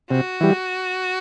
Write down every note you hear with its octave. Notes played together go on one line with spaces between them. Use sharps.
C3 F#4
E3 G3